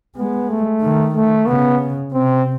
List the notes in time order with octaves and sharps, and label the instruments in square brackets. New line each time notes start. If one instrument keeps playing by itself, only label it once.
[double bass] G#3 [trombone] B3
[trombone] A3
[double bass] D#3
[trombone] A3
[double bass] C#3 [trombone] B3
[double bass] C3 [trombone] C4